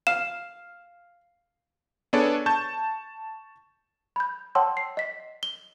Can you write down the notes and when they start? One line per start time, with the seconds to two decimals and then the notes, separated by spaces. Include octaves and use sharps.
0.07 F5 E7
2.13 B3 D4 G#4 A4 C#5 D5
2.46 A5 C#6 G6
4.16 B5 G6
4.55 C#5 F#5 G5 A5 C6 E6
4.77 C7
4.97 D#5 B6
5.43 G7